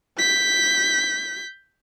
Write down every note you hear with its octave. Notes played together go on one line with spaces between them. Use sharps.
G6 B6